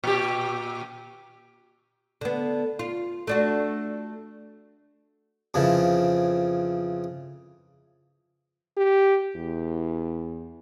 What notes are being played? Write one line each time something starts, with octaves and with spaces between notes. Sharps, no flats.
A#2 G4
D3 B3
F4
A3 D4 F#4
F2 C#3 E3 F3
G4
E2